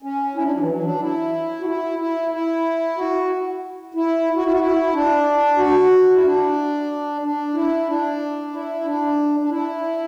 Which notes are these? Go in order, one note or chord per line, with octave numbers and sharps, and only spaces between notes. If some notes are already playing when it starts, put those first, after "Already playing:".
C#4
E4
D4
F#3
E3
F#3
D4
E4
F#4
E4
E4
E4
F#4
E4
F#4
E4
F#4
E4
D4
F#4
E4
D4
D4
E4
D4
E4
D4
D4
E4